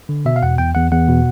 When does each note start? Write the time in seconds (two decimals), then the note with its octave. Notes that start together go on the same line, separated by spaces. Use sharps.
0.09 D3
0.25 B2 E5
0.36 F5
0.43 E2 F#5
0.58 E2 G5
0.75 E2 F#5
0.91 E2 F#5
1.08 B2